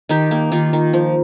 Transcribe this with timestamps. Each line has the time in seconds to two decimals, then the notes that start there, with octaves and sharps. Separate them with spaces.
0.09 D#3 D#4 G4
0.31 A#3
0.52 D#3 F4
0.73 D#3
0.93 F3